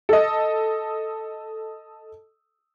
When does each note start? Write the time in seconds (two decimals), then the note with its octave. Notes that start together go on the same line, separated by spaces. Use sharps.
0.09 A4 D#5